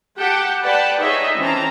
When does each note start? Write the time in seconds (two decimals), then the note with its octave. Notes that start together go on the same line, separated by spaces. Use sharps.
0.18 G4 F#5 G5 A5
0.62 B4 D5 F#5 G5 A5
1.01 D#4 G#4 C#5 D#5 E5
1.38 E3 C4 C#4 A5 A#5